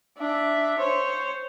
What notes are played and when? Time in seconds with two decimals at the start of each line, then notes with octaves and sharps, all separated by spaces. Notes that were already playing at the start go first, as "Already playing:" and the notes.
0.18 D4 E5
0.78 C5 C#5